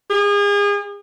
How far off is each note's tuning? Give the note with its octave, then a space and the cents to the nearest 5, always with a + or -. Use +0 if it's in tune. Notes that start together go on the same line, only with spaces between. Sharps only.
G#4 -35